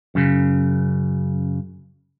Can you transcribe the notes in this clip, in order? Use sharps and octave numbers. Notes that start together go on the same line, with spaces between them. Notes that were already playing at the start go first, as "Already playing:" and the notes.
F#2 C#3